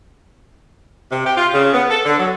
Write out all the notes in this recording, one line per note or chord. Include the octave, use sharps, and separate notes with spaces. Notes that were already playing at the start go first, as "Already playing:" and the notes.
C3
G4
F4
C#3
B3
A4
D3
F#3